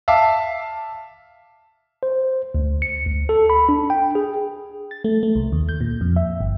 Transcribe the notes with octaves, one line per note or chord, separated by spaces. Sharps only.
E5 F5 A5 D6
C5
D2
C#7
D2
A4
B5
D4
G5
G#4
A6
A3
A3
C2
D#2
G6
A#2
F2
E5
G1